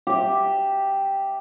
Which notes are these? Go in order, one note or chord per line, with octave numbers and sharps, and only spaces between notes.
G4 E5